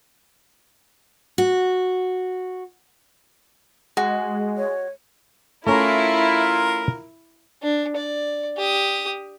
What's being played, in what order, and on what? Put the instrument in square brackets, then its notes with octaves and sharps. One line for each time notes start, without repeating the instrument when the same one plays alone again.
[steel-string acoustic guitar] F#4
[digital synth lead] G#3 [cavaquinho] F#4
[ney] C#5
[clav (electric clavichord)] A3 C#4 A#5 [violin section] E4 [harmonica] F4 A#4
[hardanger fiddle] D4
D5
G4 D#6